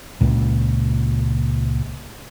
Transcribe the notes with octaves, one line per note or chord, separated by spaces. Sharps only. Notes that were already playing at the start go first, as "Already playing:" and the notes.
C#2 A#2